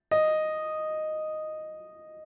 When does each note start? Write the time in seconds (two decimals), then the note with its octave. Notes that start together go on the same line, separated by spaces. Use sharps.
0.11 D#5